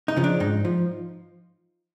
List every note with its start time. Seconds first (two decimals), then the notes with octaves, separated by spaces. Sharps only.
0.08 D#4
0.16 C#3 F3
0.24 D4
0.40 G#2 D#4
0.65 F3